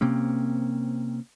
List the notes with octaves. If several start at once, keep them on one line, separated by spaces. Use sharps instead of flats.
C3 A#3 C4 C#4